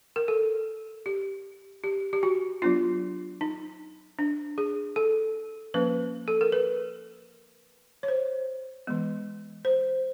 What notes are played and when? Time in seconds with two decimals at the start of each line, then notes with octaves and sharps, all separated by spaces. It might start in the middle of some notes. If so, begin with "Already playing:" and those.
0.16 A#4
0.28 A4
1.06 G4
1.84 G4
2.13 G4
2.23 F#4
2.62 F#3 B3 D4 F4
3.41 D#4
4.19 D4
4.58 G#4
4.96 A4
5.74 F3 A#3 C#4 B4
6.28 A4
6.41 A#4
6.52 B4
8.03 C#5
8.08 C5
8.87 E3 G#3 B3
9.65 C5